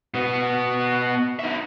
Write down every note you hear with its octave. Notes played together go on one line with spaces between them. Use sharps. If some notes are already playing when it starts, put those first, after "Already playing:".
B2 B3
D#4 E5